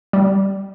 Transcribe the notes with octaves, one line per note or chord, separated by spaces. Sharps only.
G3